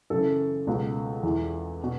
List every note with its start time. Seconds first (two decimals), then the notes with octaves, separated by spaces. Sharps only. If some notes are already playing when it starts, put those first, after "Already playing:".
0.10 F#2 C#3 E3 A4
0.67 C#2 B2
1.23 E2 E3
1.84 B2